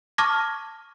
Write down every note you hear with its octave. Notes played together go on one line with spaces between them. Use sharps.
A5 C#6 D6 F6 G#6 A#6